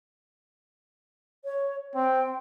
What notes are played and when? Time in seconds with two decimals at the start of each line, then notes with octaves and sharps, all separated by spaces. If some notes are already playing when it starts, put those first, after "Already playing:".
1.44 C#5
1.95 C4 G5